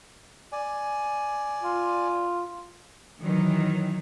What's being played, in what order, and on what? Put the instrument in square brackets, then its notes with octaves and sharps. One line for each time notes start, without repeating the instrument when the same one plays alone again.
[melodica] D5 G#5
[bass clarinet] F4
[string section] D#3 E3 F#3